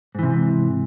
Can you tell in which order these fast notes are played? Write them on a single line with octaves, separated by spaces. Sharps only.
G#2 E3 C3